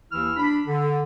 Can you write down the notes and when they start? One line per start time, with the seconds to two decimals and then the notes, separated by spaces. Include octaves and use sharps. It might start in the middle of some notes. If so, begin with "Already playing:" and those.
0.11 D#2 E3 E4 E6 F6
0.37 D4 B5
0.67 D3